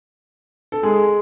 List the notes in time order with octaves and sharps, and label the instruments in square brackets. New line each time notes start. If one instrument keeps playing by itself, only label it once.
[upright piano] A4
G#3 G#4